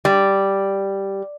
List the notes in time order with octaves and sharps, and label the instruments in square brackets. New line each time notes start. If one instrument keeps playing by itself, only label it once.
[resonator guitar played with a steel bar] G3